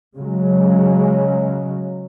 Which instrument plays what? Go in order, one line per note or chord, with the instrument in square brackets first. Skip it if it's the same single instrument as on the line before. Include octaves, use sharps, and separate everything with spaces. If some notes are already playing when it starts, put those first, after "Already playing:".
[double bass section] C#3 F#3 G#3